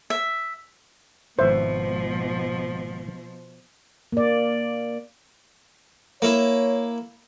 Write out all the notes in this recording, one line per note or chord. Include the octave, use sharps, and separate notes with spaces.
E5
G#1 B2 F3 E4 B4 C5 E5
A#3 D5
A#3 E4 C#5